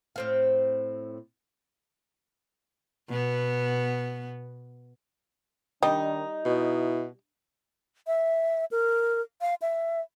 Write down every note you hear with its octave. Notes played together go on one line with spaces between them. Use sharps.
A2 C4 F5
B2 B3
D#3 G3 D4 D#4 D#5
B2 E4
E5
A#4
F5
E5